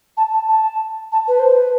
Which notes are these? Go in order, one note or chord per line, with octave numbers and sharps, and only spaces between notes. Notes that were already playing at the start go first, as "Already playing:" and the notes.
A5
A5
A5
A5
B4
C5
B4